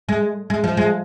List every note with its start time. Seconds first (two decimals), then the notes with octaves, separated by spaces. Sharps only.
0.09 G#3
0.50 G#3
0.64 F3
0.77 G#3